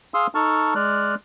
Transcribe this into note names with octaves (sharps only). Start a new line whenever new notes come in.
G#4 F5 C6 D#6 E6
D#4 A4 A5 C#6 F6
G#3 D5 F6 F#6